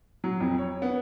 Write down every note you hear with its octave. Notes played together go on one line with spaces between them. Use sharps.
F#3
F2
C#5
B3